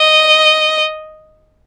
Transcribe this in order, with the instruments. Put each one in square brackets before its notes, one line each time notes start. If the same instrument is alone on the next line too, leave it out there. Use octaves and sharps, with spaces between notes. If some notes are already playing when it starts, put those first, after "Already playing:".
Already playing: [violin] D#5